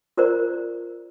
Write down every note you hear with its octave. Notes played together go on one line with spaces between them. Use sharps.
F4 A#4 C5 D5 A#5